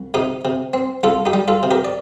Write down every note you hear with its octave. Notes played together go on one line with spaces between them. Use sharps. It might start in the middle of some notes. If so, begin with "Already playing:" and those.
Already playing: C2
C3 D#4 G4
C3
C4
C2 F4 A4
D#4 G4
G3
F4 A4
C3
G4 A#4
D5